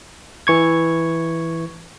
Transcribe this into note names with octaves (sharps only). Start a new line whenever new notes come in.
E3 C#6 G#6